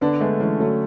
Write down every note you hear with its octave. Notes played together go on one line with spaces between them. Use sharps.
D3 B3 D4
G#3 A3 B3
E3 G#3 C#4
D3 F#3 A3